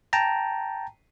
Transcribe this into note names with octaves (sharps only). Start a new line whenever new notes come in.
G5 A5 A#5